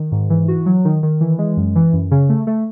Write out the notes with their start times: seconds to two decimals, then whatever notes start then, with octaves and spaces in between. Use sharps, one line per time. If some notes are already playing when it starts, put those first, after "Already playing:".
Already playing: D#3
0.12 G#2
0.30 E3
0.48 F#4
0.66 F#3
0.85 D#3
1.03 D#3
1.21 E3
1.38 G#3
1.57 F#2
1.75 E3
1.93 F#2
2.11 C#3
2.29 A3
2.47 A3